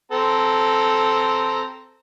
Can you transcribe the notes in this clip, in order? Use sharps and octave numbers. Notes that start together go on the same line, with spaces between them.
C4 A4 A#5